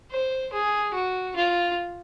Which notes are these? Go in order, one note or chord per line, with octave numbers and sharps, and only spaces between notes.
C5
G#4
F#4
F4